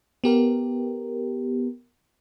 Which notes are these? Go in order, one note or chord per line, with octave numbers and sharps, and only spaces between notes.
B3 G4 A#4